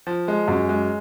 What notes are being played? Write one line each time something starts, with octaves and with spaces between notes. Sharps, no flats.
F3
G#3
F#2
G#3